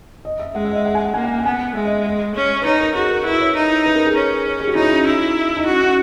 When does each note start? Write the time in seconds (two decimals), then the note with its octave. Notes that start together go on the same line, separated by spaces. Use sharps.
0.25 D#5
0.39 E5
0.55 G#3 F#5
0.65 E5
0.71 D#5
0.76 E5
0.85 F#5
0.95 G#5
1.05 F#5
1.14 A#3 G#5
1.24 F#5
1.38 F#5
1.45 B3 G#5
1.75 G#3 E5
1.85 D#5
2.05 D#5
2.35 C#4
2.62 B4
2.65 D#4 C#5
2.81 A#4
2.95 F#4 G#4
3.11 A#4
3.25 E4 B4
3.40 C#5
3.55 D#4
3.86 B4
3.96 A#4
4.06 G#4
4.15 C#4
4.60 G#4
4.67 F#4
4.75 D#4 E4
4.91 C#4
5.06 D#4 E4
5.57 D#4
5.66 C#4 F#4
5.81 C#4